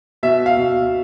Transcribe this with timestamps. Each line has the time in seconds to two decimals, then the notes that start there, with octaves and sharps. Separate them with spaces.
0.23 B2 E5
0.46 F5
0.56 B2